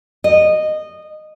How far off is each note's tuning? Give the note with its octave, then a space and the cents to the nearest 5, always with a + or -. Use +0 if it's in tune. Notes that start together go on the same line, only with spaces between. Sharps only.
D#5 -15